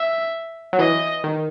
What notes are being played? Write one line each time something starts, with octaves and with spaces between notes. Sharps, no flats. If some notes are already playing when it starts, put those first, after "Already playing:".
Already playing: E5
F#3
E3 D#5
D#3